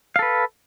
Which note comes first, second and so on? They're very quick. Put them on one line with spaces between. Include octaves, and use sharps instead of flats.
F5 A4 B4